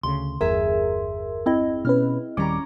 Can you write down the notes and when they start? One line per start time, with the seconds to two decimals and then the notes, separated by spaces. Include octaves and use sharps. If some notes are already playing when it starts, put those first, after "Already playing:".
0.03 D2 C#3 C6
0.41 G1 E2 G#4 A#4 E5
1.46 C4 E4 D#5
1.85 B2 C#4 B4 F6
2.37 D#1 D#3 G3 C#4 A#5 D6